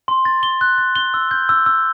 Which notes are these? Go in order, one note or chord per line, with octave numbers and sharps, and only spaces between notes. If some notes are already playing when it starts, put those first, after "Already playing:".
C6
A6
G7
F#6
A6
G7
E6
G6
E6
E6